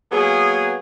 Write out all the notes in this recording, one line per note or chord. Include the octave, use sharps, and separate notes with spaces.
F#3 A#3 B3 G#4